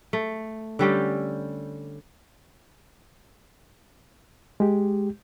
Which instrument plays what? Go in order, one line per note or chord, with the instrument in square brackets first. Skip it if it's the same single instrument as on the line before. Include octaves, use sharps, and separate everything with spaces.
[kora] A3
D3 G3 C#4 G4
[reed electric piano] G#3 G4